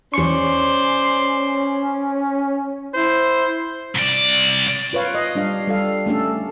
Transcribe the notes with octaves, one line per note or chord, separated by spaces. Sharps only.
E2 C#4 C5 D5 C#6
E4 C5
C2 D5
F4 B4 C#5 F5
D#5
G3 D4 D#5 F5
G3 A4 F5
A3 C#4 D4 A4